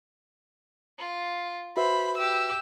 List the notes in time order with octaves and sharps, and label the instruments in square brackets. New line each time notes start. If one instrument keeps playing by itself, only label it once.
[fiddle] F4
[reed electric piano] F#4 B4 E5 [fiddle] C5 [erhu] B5
[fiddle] G4 [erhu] E6